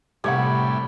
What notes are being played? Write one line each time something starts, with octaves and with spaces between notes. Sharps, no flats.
A2 C3 G3 G4 C#5 E5 F#5 B5